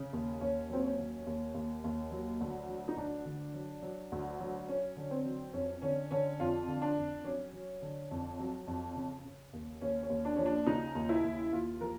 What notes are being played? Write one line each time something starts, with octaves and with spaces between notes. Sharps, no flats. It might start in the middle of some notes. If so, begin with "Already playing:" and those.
Already playing: C#3 C#4
D#2
D#2 C#4
F#3 C4
C#4
D#2
D#2
D#2
D#2
F#3
D2
F#3
D#4
D2 D4
D3
F#3
F#3
D2
F#3
F#3 C#4
D3
C4
F#3
F2 C#4
D3 C#4
D3 C#4
F2 F4
D3
D4
F2
F#3 C#4
F#3
D3
F2
F#3
F2
C#3
C#3
D#2
D#2 C#4
C#4
D#2
D4
F3 C#4
D4
C#3 D#4
D#2
E4
D#2
D#2 F4
F3 A#4